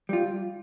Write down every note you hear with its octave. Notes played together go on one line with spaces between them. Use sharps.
G3 F4